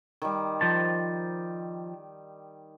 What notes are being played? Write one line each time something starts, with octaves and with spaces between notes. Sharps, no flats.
D#3 G3
F3 C5 A5